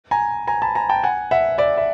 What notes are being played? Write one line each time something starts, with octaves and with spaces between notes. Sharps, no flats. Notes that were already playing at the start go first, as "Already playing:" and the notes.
G#5 A#5
G#5 A#5
A5 B5
G#5 A#5
G5 A5
F#5 G#5
E5 F#5
D5 E5
E5